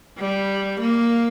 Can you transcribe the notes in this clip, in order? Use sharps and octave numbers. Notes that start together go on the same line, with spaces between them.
G3
A#3